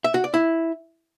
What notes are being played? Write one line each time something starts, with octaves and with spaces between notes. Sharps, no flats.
E5
F#4
D5
E4